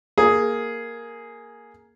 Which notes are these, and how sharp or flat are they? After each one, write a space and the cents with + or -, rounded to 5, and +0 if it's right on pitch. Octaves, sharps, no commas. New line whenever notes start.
A#3 +0 G#4 +5